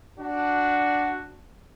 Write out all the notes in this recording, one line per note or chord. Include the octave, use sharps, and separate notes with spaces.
D4 F#4